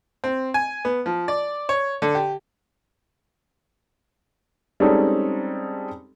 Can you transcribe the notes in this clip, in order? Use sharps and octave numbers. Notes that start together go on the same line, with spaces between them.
C4
G#5
B3
F3
D5
C#5
D3
G4
G3 G#3 C4 C#4 D#4 A4